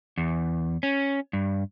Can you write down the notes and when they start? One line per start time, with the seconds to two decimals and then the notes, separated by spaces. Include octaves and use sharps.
0.18 E2
0.83 C#4
1.33 G2